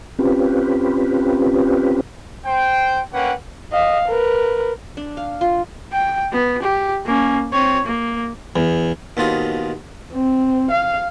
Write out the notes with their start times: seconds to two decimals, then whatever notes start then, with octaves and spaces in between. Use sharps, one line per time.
0.19 C4 C#4 F4 G4 B4
2.46 C5 G5
3.14 A#3 C#4 B4 F#5 G5
3.72 D#5 F5
4.08 A#4 B4
4.97 D4
5.17 F5
5.41 F4
5.92 G5
6.32 B3
6.62 G4
7.06 A#3 C#4
7.53 C4 C#5
7.85 A#3
8.56 E2
9.17 D#2 B2 C4 F4 D#6
10.13 C4
10.71 F5